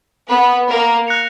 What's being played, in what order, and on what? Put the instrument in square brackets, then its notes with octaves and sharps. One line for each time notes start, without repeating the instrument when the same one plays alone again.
[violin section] B3 B4
A#3 A#4
[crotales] F#6 A#6 C#7 F7